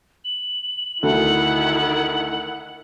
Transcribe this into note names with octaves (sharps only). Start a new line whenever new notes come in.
F#7
D2 D#3 E4 F#5